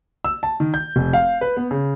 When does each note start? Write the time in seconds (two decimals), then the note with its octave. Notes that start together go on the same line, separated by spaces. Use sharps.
0.24 E6
0.43 A5
0.60 D#3
0.74 G6
0.96 F1
1.13 F5
1.41 B4
1.57 B3
1.71 C#3